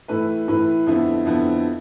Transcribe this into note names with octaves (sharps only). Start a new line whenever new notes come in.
A2 E3 A3 E4 B4
A2 E3 A3 E4 B4
F2 D3 F3 B3 E4
F2 D3 F3 B3 E4